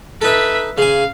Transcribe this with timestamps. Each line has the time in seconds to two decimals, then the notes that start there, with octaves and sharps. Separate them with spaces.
0.21 D#4 A4 B4 E5
0.78 C#3 F5 G#5